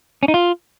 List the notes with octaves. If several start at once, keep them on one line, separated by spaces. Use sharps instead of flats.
C#4
D#4
F4